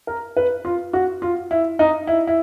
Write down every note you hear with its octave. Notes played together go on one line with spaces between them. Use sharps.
A#4
B4
F4
F#4
F4
E4
D#4
E4
E4